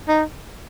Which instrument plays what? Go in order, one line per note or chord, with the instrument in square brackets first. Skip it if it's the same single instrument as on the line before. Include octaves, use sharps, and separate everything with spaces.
[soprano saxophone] D#4